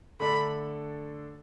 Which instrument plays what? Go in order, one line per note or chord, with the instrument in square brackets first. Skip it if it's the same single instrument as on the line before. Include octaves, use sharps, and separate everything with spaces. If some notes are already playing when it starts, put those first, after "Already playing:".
[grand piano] D3 A3 D4 A4 [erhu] B5